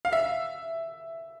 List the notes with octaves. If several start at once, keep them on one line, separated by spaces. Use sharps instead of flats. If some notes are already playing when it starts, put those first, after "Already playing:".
F5
E5